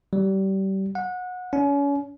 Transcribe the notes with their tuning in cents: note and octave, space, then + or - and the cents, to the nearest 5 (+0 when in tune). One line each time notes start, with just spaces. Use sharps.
G3 -30
F#5 -25
C#4 +35